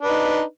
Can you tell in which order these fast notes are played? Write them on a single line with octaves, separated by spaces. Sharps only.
D4 B4 D#4